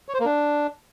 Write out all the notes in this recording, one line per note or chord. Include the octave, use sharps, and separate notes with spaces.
C#5
C5
A#3
D4